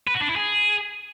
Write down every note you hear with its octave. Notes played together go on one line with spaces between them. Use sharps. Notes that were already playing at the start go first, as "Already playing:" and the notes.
B4
F#4
D4
E4
G#4